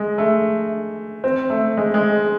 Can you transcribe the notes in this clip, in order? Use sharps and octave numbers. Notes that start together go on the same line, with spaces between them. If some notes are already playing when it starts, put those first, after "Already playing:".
Already playing: G#3
A3
C4
A3
G#3
G#3